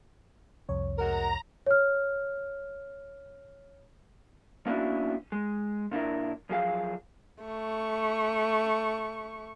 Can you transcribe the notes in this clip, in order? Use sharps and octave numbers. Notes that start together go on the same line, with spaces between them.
C2 F2 C#5
G#3 F#4 A#4 A#5
C#5 F6
A#3 B3 C#4 D4 E4 F#4
G#3
A#2 D4 E4 A#4
F#2 F3 G#4 F5
A3 C#6